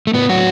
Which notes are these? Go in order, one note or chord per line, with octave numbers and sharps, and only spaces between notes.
A3
A2 B3
A2 F#3 F#4